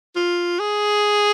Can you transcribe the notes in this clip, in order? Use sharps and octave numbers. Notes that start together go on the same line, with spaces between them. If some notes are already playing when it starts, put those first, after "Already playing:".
F4
G#4